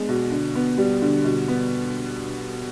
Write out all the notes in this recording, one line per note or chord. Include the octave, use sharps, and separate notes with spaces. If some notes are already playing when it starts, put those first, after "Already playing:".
Already playing: G#3 B3 D4
B2
D3
B3
G3
D3
B2
B3